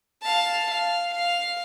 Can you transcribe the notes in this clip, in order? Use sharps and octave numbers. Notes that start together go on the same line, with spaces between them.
F5 A5
F5
F5